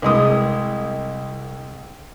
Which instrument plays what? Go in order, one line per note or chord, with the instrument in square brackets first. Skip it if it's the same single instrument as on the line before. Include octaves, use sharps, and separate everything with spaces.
[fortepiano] C2 G#3 D#6